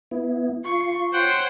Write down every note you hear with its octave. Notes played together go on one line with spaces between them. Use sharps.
B3 E4
F4 C6 C#6
C5 C#5 F#5 G5